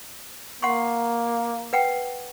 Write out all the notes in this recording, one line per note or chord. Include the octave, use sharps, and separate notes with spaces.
A#3 F#5 C6 C#6
B4 F#5 G5